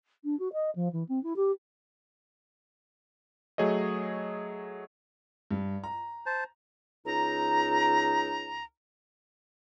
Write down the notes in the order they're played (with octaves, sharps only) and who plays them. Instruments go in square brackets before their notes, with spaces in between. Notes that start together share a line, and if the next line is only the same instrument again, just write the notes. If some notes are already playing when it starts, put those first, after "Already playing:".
[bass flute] D4
F#4
D#5
F3
E3
C4
E4
G4
[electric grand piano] F#3 A3 G#4 C#5 D#5
[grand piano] G2
A#5
[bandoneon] C5 A5
[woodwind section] C#2 D#4 A#5